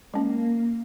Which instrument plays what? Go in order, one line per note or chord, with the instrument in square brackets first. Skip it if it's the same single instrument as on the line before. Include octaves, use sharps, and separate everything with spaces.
[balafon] G#3 C#4 [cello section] A#3